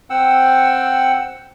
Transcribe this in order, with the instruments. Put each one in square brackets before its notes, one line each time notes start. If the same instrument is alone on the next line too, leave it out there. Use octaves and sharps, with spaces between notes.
[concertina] C4 F#5 G5 E6